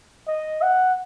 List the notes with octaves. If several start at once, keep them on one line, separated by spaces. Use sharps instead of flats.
D#5
F#5